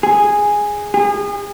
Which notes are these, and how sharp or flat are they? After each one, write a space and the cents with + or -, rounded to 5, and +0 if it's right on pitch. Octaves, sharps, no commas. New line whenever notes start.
G#4 -5
G#4 -35